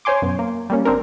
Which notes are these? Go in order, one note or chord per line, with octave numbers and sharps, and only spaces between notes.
C5 C#5 G#5 C6 D6
F#2 B2
A#3
G3 A#3 C#4
G#1 C4 D4 A#4